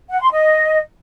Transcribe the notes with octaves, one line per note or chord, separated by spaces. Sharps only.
F#5
C6
D#5